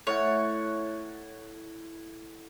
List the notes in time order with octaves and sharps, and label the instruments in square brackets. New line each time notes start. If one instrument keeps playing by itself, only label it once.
[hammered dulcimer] A2 F#5 [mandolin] C#5